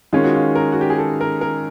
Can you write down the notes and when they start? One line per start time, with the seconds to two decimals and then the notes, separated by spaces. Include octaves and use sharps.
0.13 D#3 G#3 C#4 F4
0.24 F#4
0.34 F4
0.55 A#4
0.72 F#4
0.81 G4
0.90 G#4
0.98 A4
1.21 A#4
1.41 A#4